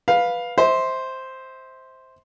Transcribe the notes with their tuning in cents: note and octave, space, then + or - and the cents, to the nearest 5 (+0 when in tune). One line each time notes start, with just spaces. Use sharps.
B4 -5 F5 +10
C5 +0 E5 -35